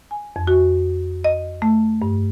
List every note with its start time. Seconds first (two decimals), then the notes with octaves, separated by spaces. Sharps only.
0.11 G#5
0.36 F2
0.47 F#4
1.24 D#5
1.62 A3
2.02 G2